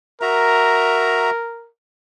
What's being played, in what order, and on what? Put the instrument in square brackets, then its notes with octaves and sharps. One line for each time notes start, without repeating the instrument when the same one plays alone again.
[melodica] F#4 E5 A#5 [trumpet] A#4